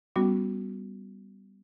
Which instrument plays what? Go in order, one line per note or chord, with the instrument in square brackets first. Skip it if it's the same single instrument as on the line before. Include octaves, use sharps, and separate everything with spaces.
[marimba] G3 B3 C#4 F#4 C#6 D6